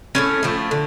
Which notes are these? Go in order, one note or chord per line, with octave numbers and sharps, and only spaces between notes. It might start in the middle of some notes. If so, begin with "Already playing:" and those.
A2 F3 A3 C#4
A2 F3 A3
D3